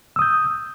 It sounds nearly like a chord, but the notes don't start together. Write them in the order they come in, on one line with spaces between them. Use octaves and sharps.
E6 D#6 G6